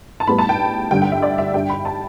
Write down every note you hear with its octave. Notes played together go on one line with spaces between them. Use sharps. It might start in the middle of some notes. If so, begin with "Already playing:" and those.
A5
A2 G3 B3 B5
A5
G5
G2 D3 G3 G5
G5
E5
D5
E5
G2 G3 D4 G5
B5
A5